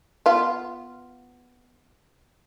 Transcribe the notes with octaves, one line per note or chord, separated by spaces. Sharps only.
B3 F4